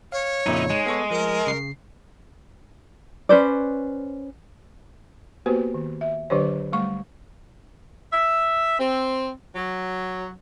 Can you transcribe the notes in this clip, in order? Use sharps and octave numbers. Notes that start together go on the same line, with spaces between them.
C#5 F5
F2 A#2 C#3 D#4 E4
G#3 D#4
B3 A4 C#6
F3 A#4
C#3 C7
C#4 B4 C5 D5
A#3 B3 F#4 G4 B4 C5
D#3
E5
D3 F#3 D4 G4 C5 C#5
G3 A3 C#6
E5
C4
F#3